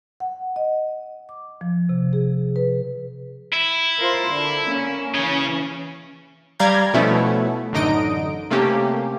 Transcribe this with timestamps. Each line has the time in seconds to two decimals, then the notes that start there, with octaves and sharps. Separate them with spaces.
0.20 F#5
0.56 D#5
1.29 D6
1.61 F3
1.89 C3
2.13 G#4
2.56 B4
3.52 E4
3.99 F4 A#4 C5
4.29 D3
4.66 A#3 C#4
5.14 C#3 E3 C#4 G#4
6.59 G3 D5 F5 A#5 G6 G#6
6.94 B2 F3 A3 B3 C#4 E4
7.73 A1 F#2 D3 D#4 D#5 D7
8.50 C3 A3 A#3 C#4 G4